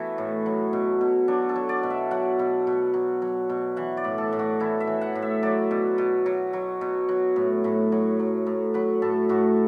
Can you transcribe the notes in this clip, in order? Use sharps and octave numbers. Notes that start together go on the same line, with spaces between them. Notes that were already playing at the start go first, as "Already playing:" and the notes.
Already playing: E3 A3 B3 E4 F#4
A2
F#3
B2
B2
F#3 D4
A4
F#3
D5
B2
E5
F#3 F#5
B2
B2
F#3
F#3
B2
E3 F#5
D5
A2
A4
A2
F#4
E3 E4
E5
E3
F#5
A2
E5
F#3 D5
B2
B2
F#3
F#3
B2
F#3
A2
A2
F#3
F#3
A2
F#3 B4
A2 A4
A2 F#4